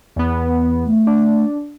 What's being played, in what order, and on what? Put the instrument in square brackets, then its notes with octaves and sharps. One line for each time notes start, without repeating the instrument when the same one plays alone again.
[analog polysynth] E2 B3
[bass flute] A3
[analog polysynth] D4